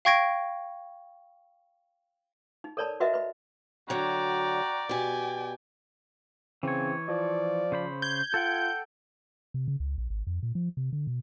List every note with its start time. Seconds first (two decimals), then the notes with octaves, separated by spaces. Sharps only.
0.05 F5 G5 C#6 G#6 A#6 D7
2.64 D#4
2.77 A4 A#4 C#5 D5 A5 B5
3.00 F#4 A#4 B4 D#5 E5 F#5
3.14 B4 B5
3.90 D3 F#3 F#4 D5 G5 A#5
4.89 B2 G4 G5 G#5
6.63 C#3 E3 C4 C#5
7.08 F3 D5
7.72 C#3 C5 B5
8.02 G6 G#6
8.34 F4 A4 F#5 G5
9.54 C3
9.68 C#3
9.80 C#2
9.98 A#1
10.10 G#1
10.27 F2
10.43 A#2
10.55 F3
10.77 C3
10.93 D3
11.07 B2